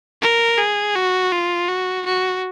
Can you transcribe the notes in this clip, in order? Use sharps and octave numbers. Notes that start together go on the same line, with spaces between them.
A#4
G#4
F#4
F4
F#4
F#4